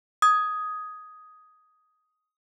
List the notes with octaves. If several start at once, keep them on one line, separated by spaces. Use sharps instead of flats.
D#6 G#6